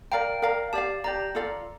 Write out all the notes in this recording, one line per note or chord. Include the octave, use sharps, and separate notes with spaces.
A#4 D5 F5 G5 A#5
A#4 D5 F5 A#5
G4 D5 F5 A5
G4 D5 F5 A#5
F4 A4 D5 F5